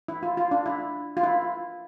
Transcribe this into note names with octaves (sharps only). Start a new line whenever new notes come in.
E4
F4
F4
D4
E4
F4
E4